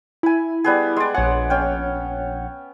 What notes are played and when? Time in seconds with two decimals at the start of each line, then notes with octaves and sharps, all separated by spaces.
0.23 E4 G#5 B5
0.64 G3 B3 G#4
0.96 G#3 D5
1.14 A#1 G#4 C#5 F#5
1.50 C#4 G5